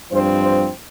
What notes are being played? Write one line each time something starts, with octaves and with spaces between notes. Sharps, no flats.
G2 F3 C4 C5
C5